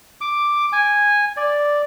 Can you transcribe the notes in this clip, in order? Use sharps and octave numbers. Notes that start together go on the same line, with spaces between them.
D6
G#5
D5